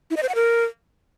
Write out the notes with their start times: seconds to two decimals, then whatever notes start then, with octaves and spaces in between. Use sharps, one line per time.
0.10 E4
0.17 D#5
0.23 C5
0.29 F#5
0.35 A#4